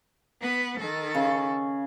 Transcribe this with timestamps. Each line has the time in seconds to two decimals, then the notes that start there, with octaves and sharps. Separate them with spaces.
0.42 B3 B4
0.80 D#3 A4
1.15 C#3